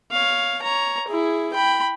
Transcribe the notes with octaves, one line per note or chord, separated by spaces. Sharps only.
C#5 F5
C#5 A#5
E4 G#4
G5 B5